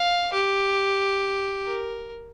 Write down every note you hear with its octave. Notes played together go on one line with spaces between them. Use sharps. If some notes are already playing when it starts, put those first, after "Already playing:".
Already playing: F5
G4
A#4